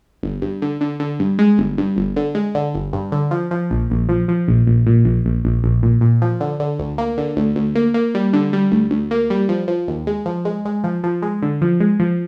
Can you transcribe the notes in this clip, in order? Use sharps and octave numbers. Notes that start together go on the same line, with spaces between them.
G1
G2
D3
D3
D3
G2
G#3
G1
G2
G1
D3
G#3
D3
G1
G2
D3
F3
F3
A#1
A#1
F3
F3
A#1
A#1
A#2
A#1
A#1
A#1
A#1
A#2
A#2
F3
D3
D3
D2
A#3
D3
D2
D2
A#3
A#3
G3
D3
G3
D2
D2
A#3
G3
F3
F3
D#2
G#3
F3
G#3
G#3
F3
F3
G#3
D3
F3
G#3
F3